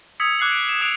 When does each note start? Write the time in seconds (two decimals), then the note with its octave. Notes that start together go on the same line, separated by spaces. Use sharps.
0.20 D#6 E6 G#6 B6 C#7
0.39 D6 F#6 G#6 C7 F#7
0.52 D7
0.69 E7
0.81 D#6 F#6 C7 D7 F7